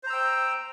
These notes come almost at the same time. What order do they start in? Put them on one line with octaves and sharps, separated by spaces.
C5 A#5 E6 G5